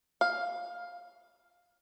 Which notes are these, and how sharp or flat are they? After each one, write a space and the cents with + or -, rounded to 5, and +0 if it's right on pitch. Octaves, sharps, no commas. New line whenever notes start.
F5 +10